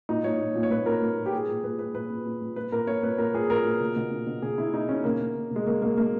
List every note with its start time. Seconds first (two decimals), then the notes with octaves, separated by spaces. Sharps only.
0.09 A#2 D#4
0.24 A#2 C#5
0.40 A#2
0.55 A#2
0.63 C#5
0.71 A#2 B4
0.86 A#2 A#4
1.02 A#2
1.17 A#2
1.26 G4
1.32 A#2 G#4
1.49 A#2
1.63 A#2 B4
1.79 A#2 B4
1.94 A#2 B4
2.10 A#2
2.26 A#2
2.42 A#2
2.56 A#2 B4
2.72 A#2 A#4
2.87 A#2 C#5
3.03 A#2 B4
3.18 A#2 A#4
3.34 A#2 G#4
3.50 A#2 A#4
3.65 A#2
3.80 B2
3.96 B2
4.11 B2
4.27 B2
4.42 B2 G#4
4.58 B2 E4
4.73 B2 D#4
4.89 B2 C#4
5.04 B2 A#3
5.19 B2
5.36 B2
5.51 B2 G#3
5.67 B2 A#3
5.82 B2 A#3
5.97 B2 A#3